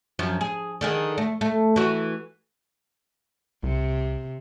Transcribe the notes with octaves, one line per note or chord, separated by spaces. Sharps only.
F#2 F3
G#4
D3 D#3 G#4
A3
A3
E3 F#4
C2 C3